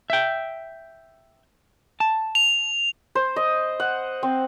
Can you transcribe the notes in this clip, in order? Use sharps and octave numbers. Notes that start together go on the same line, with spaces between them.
E5 G5
A5
F7
C5
D#5
F#5
C4